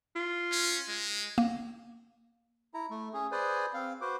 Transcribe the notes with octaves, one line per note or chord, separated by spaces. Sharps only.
F4
C#4
G#3
A#3
E4 A#5
A3
C#4 G#4
G#4 B4 C5 D5 G#5
C4 F5
F#4 B4 C5 D6